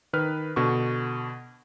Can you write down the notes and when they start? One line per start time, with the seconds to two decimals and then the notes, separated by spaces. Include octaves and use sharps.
0.13 D#3 B4 F6
0.56 B2 D3 C#6